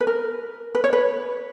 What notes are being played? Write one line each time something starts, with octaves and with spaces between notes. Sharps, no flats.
B4
A#4
B4
C#5
B4